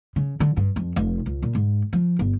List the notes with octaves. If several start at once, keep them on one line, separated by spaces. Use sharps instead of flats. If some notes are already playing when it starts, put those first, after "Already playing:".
C#3
D3
G2
F2
F1
C#2
A#2
G#2
F3
G1